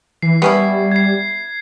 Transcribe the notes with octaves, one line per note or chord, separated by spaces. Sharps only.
E3 C7
G3 B3 C#4 E4
G#6 C7